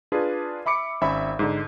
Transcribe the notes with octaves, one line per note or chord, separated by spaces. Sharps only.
D4 F4 G#4 B4
E5 B5 D6 C#7
G#1 C#4 E5 B5
G#2 D3